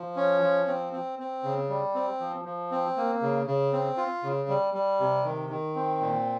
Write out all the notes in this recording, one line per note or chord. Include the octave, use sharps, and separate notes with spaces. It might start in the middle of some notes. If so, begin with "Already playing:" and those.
Already playing: F3
C#4
F3
C4
C4
C4
C#3
G3
C4
F3
F3
C4
A#3
C#3
C#3
C4
F4
C#3
G3
G3
C3
D#3
D#3
C4
A#2